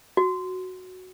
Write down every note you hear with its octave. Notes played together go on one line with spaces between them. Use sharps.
F#4